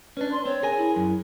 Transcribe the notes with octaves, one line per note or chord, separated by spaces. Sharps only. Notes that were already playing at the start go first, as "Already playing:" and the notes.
C#4 D4 B4
C6
C4 C#5
G#4 A#4 G#5
E4
F#2